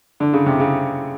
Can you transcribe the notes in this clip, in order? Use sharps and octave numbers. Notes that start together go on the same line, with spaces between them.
D3
C#3
C3
C#3